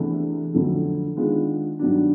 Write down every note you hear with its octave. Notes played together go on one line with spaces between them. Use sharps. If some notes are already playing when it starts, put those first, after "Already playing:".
Already playing: E2 C3 E3 A3 D4
F2 D3 F#3 A3 D4
D#3 G#3 B3 D4 F4
G2 D#3 F#3 B3 D4